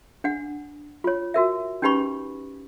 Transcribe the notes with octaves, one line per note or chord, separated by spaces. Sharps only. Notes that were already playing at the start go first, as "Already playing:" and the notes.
D4 F#5
F4 C#5
F#4 A#4 E5
C#4 D#4 G4 B4 B5 C#6